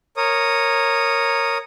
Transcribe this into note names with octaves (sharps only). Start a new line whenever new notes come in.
A#4 C#5 D#6